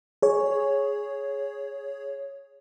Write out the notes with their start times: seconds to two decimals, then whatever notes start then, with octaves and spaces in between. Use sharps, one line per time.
0.22 G#4 C#5